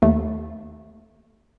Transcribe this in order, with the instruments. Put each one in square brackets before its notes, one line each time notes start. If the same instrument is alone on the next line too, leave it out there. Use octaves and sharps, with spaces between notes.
[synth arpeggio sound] D#2 A3